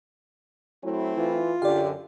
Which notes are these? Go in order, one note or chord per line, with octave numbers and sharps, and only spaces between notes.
F#3 A3 C4 E4
E3 F4
F#2 D3 G4 D5 F5